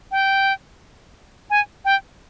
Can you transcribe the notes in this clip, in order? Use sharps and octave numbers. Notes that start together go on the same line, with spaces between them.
G5
G#5
G5